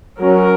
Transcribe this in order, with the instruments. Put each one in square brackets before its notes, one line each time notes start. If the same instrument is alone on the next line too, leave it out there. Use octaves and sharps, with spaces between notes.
[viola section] F#3 C#4 A#4